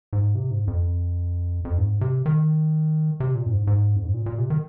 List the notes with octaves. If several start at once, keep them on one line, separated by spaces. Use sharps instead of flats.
G#2
C3
G#2
F2
F2
G#2
C3
D#3
C3
A#2
F2
G#2
G#2
F2
G#2
A#2
A#2
C3
D#3